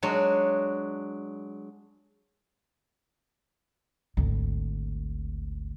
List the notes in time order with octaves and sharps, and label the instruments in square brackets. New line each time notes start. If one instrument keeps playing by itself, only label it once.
[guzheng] F#3 G#3 D4 F#4
[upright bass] G#1 D2